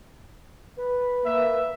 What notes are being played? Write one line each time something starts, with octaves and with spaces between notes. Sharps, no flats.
B4
A#3 E5